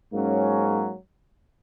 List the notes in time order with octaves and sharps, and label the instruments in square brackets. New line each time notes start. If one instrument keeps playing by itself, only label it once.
[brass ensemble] G#2 F#3 A#3 C#4